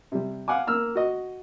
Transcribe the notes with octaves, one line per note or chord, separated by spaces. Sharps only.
C3 G3
F5 F#5 G#5 D6
A#3 E6 F6
F#4 D#5